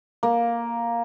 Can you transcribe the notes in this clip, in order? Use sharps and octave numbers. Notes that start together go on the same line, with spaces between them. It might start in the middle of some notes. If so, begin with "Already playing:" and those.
A#3